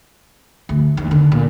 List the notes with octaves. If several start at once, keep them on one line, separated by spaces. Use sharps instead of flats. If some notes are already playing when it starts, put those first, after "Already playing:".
D2
D#2
D3
A#2